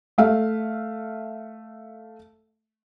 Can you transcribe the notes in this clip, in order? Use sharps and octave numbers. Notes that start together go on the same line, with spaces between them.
A3 E5 F5